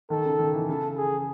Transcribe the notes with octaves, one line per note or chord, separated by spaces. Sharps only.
D#3 A4
C#3
D#3
E3
C#3 A4
G#4